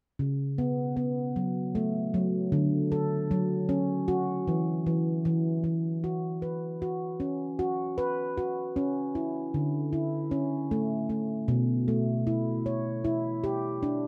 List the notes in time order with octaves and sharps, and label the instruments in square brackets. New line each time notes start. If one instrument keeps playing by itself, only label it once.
[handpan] C#3
B3
B3
F#3
A3
F#3
D3
A4
F#3
C#4
F#4
E3
E3
E3
E3
F#4
B4
F#4
C#4
F#4
B4
F#4
C#4
E4
D3
E4
C#4
A3
A3
B2
A3
E4
C#5
E4
G4
D4